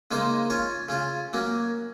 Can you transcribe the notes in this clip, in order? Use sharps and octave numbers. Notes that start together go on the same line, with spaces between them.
C#3 G#3 A#3 D#4 C5
C#4 F4 C#5
C#3 C#4 F4
F#3 A#3 C#4